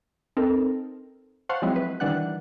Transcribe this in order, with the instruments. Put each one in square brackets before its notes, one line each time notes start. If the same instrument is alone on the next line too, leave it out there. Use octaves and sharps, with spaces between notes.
[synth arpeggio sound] C4 D#4 A4 A#4
C5 F5 F#5 A5 C6 C#6
F3 F#3 G#3 C4 E4
B4
D#3 E3 G3 D4 F#5 F#6